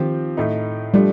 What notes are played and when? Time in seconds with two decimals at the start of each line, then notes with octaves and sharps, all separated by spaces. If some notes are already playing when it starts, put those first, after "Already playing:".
Already playing: D#3 F3 C4 G4
0.37 A2 A3 D#4
0.94 F3 G3 A3 D4